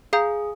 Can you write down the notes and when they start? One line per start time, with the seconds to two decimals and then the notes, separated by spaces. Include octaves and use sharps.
0.13 G#4 F5 A#5 D#6 G6